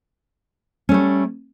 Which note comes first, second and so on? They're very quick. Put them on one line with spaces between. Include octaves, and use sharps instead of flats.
C#4 A3 G3